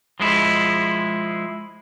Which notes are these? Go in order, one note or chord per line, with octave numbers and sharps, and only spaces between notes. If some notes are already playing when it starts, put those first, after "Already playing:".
F3 G#3 E4